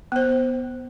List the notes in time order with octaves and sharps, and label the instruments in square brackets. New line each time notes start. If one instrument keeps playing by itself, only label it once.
[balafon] B3 C5